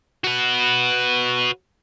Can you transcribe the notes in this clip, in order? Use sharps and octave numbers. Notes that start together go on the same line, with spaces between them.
F#4 B4